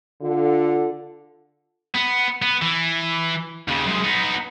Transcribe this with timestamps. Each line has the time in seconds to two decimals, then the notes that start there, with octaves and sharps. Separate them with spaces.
0.21 D3 F4
1.95 B3
2.42 B3
2.62 E3
3.68 D#2 C#3
3.86 F#2 G#3
4.04 B3 D#4